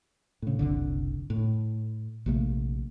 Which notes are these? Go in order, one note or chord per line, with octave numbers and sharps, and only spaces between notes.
A2 C#3
F#1 C2 D3
A2
A#1 C3 A3 A#3